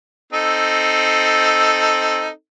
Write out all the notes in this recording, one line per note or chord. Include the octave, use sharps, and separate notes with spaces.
C4 D#4 A4